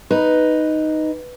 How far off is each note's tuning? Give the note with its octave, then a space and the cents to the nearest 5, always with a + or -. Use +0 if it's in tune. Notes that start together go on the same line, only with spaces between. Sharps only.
D#4 +0 B4 +0